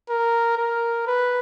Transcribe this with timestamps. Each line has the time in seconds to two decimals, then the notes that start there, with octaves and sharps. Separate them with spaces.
0.09 A#4
0.58 A#4
1.07 B4